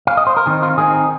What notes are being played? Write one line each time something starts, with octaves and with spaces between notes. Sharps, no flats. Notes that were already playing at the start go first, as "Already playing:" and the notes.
F5
D#5
C5
A#4
D#3 C4 D#4 G#4
F4
D#3 C4 D#4 G#4